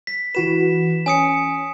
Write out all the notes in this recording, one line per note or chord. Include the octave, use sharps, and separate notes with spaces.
B6
E3 F#4 B4 E7
C#4 G#5 D#6 C#7